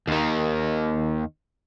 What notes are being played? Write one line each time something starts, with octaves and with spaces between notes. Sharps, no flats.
D#2 D#3